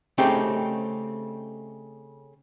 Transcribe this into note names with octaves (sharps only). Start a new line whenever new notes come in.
C#3 A3 C4 D#4 G4